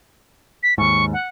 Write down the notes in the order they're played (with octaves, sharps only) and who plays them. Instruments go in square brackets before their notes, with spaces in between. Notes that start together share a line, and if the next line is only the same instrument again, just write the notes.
[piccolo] B6
[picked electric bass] D#2 G#2 [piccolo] C#6
[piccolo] F#5